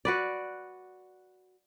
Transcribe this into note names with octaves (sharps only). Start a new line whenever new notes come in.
F#4 B4 D5